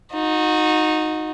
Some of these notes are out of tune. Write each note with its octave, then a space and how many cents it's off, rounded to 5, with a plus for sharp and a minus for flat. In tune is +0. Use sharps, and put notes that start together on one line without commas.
D#4 +0 F#4 -30